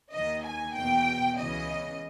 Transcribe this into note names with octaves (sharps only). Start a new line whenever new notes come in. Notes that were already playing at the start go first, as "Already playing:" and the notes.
D#2 D#3 D#5
G#5
E2 B2 G5
C#2 C#3 E3 D#5